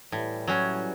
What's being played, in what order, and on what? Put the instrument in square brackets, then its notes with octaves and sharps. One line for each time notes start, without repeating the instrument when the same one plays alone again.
[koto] A2 [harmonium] E3 G3
[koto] F#3 C#4